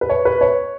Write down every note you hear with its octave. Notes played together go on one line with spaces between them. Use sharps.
B4
C#5
B4
C#5